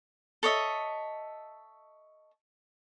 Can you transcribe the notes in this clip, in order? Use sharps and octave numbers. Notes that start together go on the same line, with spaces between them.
A4 C#5 D#5 E5